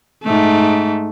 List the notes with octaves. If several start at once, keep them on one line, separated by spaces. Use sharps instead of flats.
G#2 A3